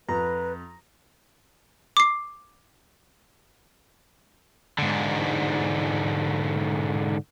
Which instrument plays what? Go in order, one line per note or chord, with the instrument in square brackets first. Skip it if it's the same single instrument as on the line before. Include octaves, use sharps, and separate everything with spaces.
[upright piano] F2 [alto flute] B4 [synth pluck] A#5
[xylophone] D6 C7
[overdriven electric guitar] G#2 D3